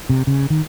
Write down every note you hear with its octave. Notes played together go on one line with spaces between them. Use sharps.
C3
C#3
D#3